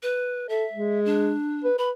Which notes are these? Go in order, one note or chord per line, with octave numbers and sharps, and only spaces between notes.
B4
A4 E5
G#3
D4
B4
B4 B5